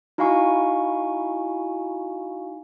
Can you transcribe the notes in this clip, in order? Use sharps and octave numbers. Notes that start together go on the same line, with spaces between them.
D#4 E4 F#4 F5 G#5 C#6